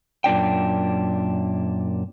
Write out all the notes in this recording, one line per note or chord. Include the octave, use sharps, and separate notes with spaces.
F#2 A#2 D4 G5